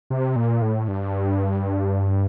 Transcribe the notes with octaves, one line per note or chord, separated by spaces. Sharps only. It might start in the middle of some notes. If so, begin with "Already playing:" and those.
C3
A#2
A2
G2